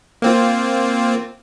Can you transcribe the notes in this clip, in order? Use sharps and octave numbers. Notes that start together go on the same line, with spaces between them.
A#3 C4 F4